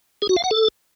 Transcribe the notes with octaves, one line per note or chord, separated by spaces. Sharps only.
G#4
F#4
F5
F#5
A4